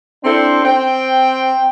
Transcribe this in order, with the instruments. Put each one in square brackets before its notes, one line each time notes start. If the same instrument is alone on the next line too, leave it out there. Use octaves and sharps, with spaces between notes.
[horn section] C4 D4 E4 A4 C5
C4 G5